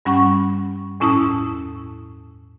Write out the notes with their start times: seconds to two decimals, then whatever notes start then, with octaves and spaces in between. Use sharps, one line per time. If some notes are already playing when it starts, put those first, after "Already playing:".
0.05 G2 G3 C#4 F#5 B5 C#6
1.00 E2 A2 C#4 E4 A5 D#6